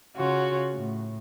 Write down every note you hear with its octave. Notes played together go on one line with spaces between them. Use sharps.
C#3 F4 F#4 C#5
A2